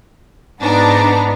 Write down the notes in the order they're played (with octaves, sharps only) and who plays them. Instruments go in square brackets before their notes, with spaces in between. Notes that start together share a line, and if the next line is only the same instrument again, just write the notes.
[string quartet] G#2 B3 D#4 [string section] D4 A#5